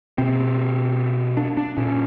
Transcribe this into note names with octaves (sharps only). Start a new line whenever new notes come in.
B2 C4
D4
D4
A#2 C#4